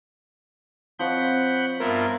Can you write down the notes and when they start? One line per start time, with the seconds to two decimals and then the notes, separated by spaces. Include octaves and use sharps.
0.99 F3 C4 C#5 D#5 F#5 B5 G6
1.80 G2 B3 E4 F4 A#4